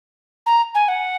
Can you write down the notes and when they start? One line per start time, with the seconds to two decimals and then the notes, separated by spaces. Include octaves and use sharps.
0.46 A#5
0.75 G#5
0.88 F#5